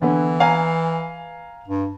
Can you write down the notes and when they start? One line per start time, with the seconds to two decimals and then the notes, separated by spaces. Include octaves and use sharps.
0.02 D3 E3 B3
0.40 F5 G#5 A#5
1.68 G2